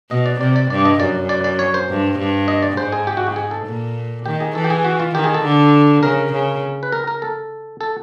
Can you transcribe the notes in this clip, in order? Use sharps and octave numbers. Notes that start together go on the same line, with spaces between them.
B2 D#5
D5
C3 D5
D5
G2 D5
D#5
F#2 D5
D5
D5
C#5
C5
G2
G2
D#5
D5
G#2 C5
G#4
G4
F#4
G4
G#4
A4
A#2
D#3 G4
G#4
E3 A4
G4
G#4
F#4
F4
D#3 G4
G#4
A4
D3
C#3 A#4
C#3
B4
A#4
A#4
A4
A4